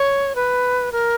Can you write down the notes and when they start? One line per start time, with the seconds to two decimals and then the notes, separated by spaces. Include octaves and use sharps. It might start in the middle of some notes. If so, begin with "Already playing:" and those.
Already playing: C#5
0.35 B4
0.92 A#4